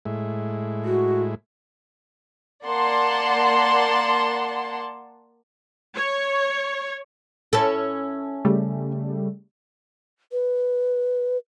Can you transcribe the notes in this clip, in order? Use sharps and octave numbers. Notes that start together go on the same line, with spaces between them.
A2 G#3 E4
F#4
A#3 D5 F#5 A5 C6
C#5
C#4 E4 A4
C#3 G3 A3
B4